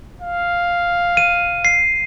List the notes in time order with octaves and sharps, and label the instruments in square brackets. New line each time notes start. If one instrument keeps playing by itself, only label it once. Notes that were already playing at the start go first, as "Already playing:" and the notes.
[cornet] F5
[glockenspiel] D#7
C7